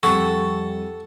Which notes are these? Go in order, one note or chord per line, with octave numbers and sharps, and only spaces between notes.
F2 G3 A4 F#5 A5 C#6